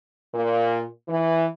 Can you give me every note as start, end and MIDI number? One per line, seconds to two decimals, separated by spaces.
0.33 0.83 46
1.08 1.46 52